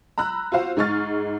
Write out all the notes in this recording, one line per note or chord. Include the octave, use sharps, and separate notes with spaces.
A#5 B5 E6 F#6
F4 F#4 C5 F5
G#2 G#3 G#4 C#6 F6 A6